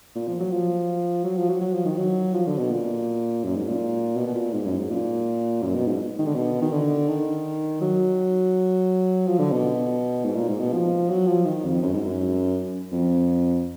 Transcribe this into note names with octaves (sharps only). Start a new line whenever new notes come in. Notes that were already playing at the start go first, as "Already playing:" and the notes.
A#2
F3
F#3
F3
F#3
F3
F#3
F#3
F3
D#3
F#3
F3
D3
B2
A#2
F#2
G#2
A#2
B2
B2
A#2
G#2
F#2
G#2
A#2
F#2
B2
G#2
D#3
D3
B2
D#3
D3
D#3
F#3
F3
D3
B2
G#2
A#2
G#2
B2
F3
F#3
F3
D#3
F2
F#2
G#2
F#2
F2